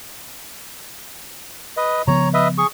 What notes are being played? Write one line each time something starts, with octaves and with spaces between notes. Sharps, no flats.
B4 D#5
C#3 F3 B3 C#5 A#5
B4 D#5 E5
G#4 C#6